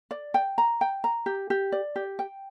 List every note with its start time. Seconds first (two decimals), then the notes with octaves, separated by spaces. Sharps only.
0.11 D5
0.34 G5
0.58 A#5
0.81 G5
1.04 A#5
1.26 G4
1.50 G4
1.72 D5
1.96 G4
2.19 G5